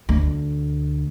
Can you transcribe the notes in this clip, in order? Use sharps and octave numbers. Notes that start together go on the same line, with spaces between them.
D2